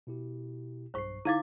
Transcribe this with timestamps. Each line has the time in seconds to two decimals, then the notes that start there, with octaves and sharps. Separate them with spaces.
0.07 B2 E4 G4
0.94 B1 G2 C5 C#6 C7
1.25 D3 D#4 E4 F5 D6 G#6 A6